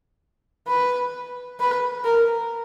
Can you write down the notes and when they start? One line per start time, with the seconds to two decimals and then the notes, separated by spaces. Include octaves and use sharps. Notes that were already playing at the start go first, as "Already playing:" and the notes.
0.68 B4
1.60 B4
2.05 A#4